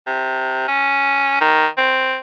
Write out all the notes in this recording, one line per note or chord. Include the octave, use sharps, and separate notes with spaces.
C3
C#4
D#3
C4